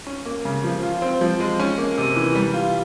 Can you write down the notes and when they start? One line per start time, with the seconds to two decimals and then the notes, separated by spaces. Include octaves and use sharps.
0.07 C#4
0.25 A#3
0.45 C#3
0.64 F3
0.83 F4
1.02 C4
1.21 F3
1.40 G#3
1.60 C#4
1.78 A#3
1.98 C3
2.16 E3
2.35 G3
2.54 F4